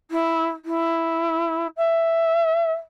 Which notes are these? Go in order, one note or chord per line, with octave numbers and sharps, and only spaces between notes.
E4
E4
E5